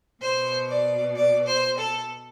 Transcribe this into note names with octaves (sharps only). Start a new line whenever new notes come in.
B2 C5
D5
D5
C5
A4